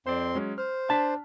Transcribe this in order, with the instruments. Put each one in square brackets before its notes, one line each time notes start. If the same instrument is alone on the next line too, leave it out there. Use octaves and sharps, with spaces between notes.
[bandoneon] F2 C4 C6 [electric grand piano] C5 D5
[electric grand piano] F#3 G#3 C#4
[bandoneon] C5 [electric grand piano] F6
[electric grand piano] D4 B6 [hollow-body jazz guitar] A5